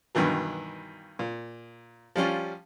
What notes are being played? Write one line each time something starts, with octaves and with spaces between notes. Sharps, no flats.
G2 B2 D#3 E3 F#3
A#2
F3 G3 C#4 F4